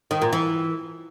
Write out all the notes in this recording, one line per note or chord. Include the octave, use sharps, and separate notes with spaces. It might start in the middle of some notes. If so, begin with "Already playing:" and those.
D#3
A#2
E3